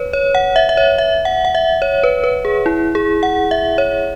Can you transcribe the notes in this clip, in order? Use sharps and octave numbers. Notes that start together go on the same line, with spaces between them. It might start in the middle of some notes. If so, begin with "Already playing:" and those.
Already playing: B4 C#5
C#5
F#5
E5
E5
C#5
E5
F#5
F#5
E5
C#5
B4
B4
G#4
E4
G#4
F#5
E5
C#5